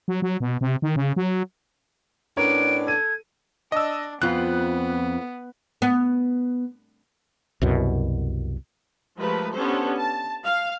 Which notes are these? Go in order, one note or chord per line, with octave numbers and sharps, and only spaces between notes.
F#3
F#3
B2
C3
D#3
C#3
F#3
A2 B3 C#4 D4 A#4 C#5 D7
A4 G#6 D#7
D4 D#5 E6
F2 B3 F4 F#6
B3
C2 F#2 B2
F3 G#3 A3 G4 A#4 B4
B3 C#4 D4 G4 A4 C5
A5
F5